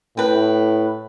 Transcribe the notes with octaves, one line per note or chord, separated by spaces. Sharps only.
A2 B4 G5